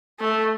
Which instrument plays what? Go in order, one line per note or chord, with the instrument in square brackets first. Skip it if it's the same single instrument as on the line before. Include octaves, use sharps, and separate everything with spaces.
[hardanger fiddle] A3